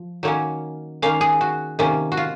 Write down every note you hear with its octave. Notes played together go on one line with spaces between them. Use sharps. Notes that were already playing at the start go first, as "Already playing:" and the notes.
Already playing: F3
D#3 F#3 A#3 C#4 C#5
D#3 A#3 C#4 F5
G#4
F#4
C3 D#3 A#3 C#4
F#4
F4